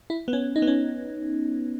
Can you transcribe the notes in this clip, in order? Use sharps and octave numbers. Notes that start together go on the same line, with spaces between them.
E4
B3
C#4
D#4
B3
C#4